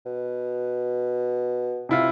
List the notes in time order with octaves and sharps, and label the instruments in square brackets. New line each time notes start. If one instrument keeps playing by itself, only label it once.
[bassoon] B2
[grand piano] C3 E4 F4